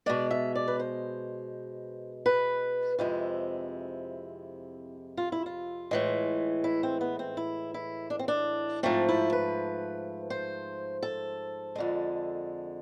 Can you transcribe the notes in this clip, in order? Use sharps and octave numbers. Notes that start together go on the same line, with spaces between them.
B2 G#3 D5
E5
D5
B4
C5
B4
F2 C3 G#3 E4
F4
E4
F4
A2 E3 G#3
E4
C4
B3
C4
E4
E4
D4
C4
D4
G#2 F3 A3 C4
E4
B4
C5
A4
F2 D3 G#3